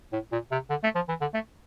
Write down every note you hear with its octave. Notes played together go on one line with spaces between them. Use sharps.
A2
A#2
C3
D3
A3
F3
E3
D3
A3